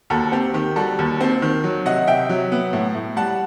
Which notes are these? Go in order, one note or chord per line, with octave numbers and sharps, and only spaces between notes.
D#2 F#4 A4
C4 G4
D#3 G4
G3 F#4 A4
D#2
C4
D#3
F#3
C3 D#5 F#5
C3 E5 G5
F#3
B3
A2
A2
G3 F#5 A5